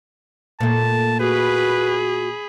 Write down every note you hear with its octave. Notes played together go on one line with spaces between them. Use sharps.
A#2 A3 A5
F#4 G#4 B4 B5